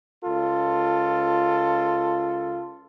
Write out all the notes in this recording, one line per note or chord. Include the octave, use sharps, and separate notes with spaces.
C#2 F4 A4